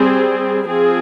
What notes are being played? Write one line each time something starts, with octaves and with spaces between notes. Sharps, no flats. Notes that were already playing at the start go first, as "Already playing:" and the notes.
Already playing: G3 C4 G#4
F3 C4 G#4